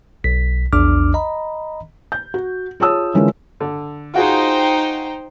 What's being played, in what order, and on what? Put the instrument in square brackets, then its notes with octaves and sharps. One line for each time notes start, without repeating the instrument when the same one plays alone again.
[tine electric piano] B1 B6
A#1 E2 D4 D6 F6
D#5 A#5 B5
[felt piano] G6
F#4
F4 G#4 C#5 A5 D#6 E6
D3 E3 G#3 C#4 F4 A#4
[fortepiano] D3
[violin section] D#4 C5 G5 [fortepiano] F4 F#4 G#4